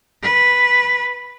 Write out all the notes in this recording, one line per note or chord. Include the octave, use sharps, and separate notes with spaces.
B4